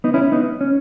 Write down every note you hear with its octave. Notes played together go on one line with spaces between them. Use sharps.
B3 D#4
C#4 E4
B3 D#4
C#4